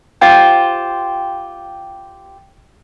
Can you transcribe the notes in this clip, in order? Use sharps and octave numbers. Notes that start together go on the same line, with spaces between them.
F4 G4 C5 G5